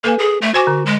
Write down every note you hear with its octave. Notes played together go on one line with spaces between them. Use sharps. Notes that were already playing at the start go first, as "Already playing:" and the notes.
A#3 A4 B4 G#5
G#4
A3
F#4 C5 G#5 D6
D3
G#3